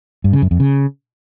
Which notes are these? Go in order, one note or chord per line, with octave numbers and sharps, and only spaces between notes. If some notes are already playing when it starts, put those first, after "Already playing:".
G2
C#3
F#2
F2
C#3